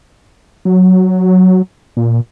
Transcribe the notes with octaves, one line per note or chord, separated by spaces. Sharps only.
F#3
A#2